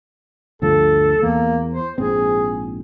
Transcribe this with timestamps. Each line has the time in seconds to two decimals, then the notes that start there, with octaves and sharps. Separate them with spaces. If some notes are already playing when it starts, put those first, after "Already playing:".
0.62 D2 G2 F3 A4
1.22 E2 A#3
1.74 C5
1.98 A#1 G#2 C4 G#4